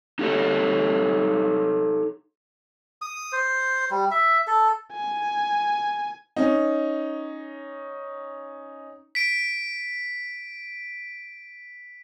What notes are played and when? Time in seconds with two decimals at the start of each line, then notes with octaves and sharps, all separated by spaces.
0.19 D#4 G4 A4 C#5
3.02 D#6
3.32 C5
3.91 G3
4.11 E5
4.47 A4
4.93 G#5
6.36 C#4 D#4
9.15 B6 D7